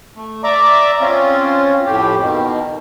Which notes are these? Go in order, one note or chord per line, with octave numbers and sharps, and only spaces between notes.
A3
D5 E5 A#5 D6
C4 C#4 F4
F2 A2 G4
B2 D#3